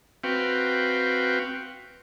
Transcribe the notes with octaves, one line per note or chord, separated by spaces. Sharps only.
C4 F#4 B4 F5 G5